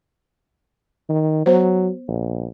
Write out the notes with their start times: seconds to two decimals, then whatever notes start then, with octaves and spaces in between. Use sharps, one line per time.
1.09 D#3
1.46 F#3 B3 C5
2.08 A#1